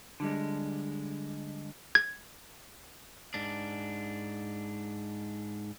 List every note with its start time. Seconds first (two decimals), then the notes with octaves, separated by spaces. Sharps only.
0.20 D3 G3 G#3
1.95 G#6
3.34 G#2 D4